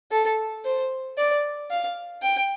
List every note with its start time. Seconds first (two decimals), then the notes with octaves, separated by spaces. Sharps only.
0.12 A4
0.65 C5
1.18 D5
1.71 F5
2.23 G5